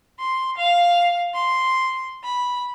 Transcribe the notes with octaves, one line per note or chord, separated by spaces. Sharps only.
C6
F5
C6
B5